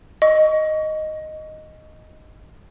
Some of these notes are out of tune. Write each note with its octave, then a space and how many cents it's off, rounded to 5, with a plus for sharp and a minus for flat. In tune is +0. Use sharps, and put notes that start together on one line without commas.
D#5 +0 C#6 +30